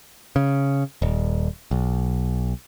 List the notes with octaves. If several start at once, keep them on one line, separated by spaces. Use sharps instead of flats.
C#3
D#1
B1